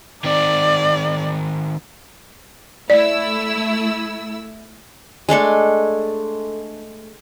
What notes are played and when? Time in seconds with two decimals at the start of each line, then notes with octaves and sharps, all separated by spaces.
0.24 D#3 C4 D5
2.90 A3 E4 D5 E6
5.29 G#3 A3 D4 A4